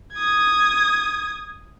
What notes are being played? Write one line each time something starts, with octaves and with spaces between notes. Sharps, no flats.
D#6 G#6